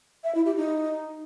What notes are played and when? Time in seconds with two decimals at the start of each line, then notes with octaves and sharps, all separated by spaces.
0.24 E5
0.35 E4
0.46 G4
0.56 D#4